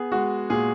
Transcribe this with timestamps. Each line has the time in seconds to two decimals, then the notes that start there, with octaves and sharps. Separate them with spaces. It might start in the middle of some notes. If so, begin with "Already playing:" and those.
Already playing: B3 G#4
0.12 G#3 F#4
0.50 A#2 G#4